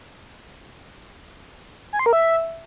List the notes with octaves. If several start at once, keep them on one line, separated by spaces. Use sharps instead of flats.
G#5
C6
A#4
E5